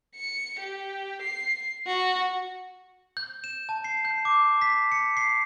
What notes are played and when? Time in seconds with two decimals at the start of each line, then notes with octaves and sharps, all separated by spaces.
0.16 C#7
0.59 G4
1.22 C7
1.86 F#4
3.17 G6
3.44 E7
3.69 A5
3.84 C7
4.05 G6
4.25 D6
4.62 B6
4.92 C#7
5.17 C7